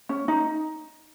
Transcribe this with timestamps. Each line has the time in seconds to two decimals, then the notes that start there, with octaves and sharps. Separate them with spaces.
0.09 C#4
0.28 D#4